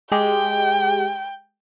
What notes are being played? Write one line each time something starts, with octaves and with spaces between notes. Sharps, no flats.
G#3 G4 G5